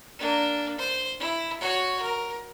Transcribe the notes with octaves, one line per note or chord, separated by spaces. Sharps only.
A#3 D4
C5
E4
F#4 C#5
A#4